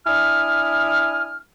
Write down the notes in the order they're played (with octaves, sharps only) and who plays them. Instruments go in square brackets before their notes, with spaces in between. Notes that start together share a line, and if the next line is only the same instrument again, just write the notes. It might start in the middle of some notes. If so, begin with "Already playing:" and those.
[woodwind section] D4 E4 G#5 D#6 F6